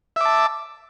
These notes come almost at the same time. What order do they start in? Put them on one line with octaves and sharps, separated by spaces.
E5 D6 A5